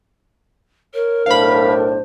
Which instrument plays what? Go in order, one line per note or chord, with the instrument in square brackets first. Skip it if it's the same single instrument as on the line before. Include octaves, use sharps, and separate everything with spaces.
[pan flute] A#4 [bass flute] C#5
[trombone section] B1 A2 D4 [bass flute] C5 [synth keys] F5 B5